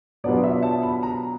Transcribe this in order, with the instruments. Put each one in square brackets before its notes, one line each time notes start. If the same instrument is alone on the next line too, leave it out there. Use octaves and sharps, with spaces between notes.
[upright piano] B2 F#3 B3 D4 F4 D5
E5
A5
B5
A#5